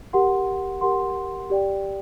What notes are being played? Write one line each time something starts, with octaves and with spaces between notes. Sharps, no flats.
G4 A#4 F#5 C6
G4 A#4 F#5 C6
G4 D5 G5